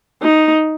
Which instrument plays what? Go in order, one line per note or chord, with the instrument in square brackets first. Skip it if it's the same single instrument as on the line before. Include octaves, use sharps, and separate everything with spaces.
[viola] D#4